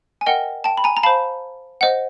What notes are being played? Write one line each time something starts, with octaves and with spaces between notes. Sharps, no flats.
G#5
A#4 D#5 F#5 G5
G5 A5
B5
G#5 A#5
A#5
C5 F5 A5 B5
C5 D#5 F#5